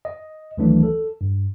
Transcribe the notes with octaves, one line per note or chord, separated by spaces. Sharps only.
D#5
D2 D#3 E3 F#3 A3 D4
A4
G2